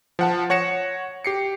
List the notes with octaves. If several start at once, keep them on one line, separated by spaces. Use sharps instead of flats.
F3 F#5 A5
C#5 F#5 A#6 C#7 E7
G4 C7 C#7